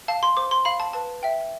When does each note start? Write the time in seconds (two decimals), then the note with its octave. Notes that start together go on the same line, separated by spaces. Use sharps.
0.08 F5 A5
0.23 C6
0.37 C5 D6
0.51 C6
0.65 F5 B5
0.80 A5
0.93 B4 A5
1.23 E5 G5